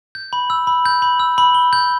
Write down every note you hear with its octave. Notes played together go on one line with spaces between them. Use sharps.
G6
B5
E6
B5
G6
B5
E6
B5
G7
G6